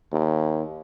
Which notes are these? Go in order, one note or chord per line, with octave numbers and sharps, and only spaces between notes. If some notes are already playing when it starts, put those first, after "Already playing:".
D#2